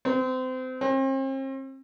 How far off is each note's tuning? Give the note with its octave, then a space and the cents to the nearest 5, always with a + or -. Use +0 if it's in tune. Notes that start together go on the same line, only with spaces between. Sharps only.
C4 -30
C4 +40